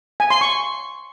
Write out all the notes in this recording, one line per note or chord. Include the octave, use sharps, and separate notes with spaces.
G#5
C6
C#6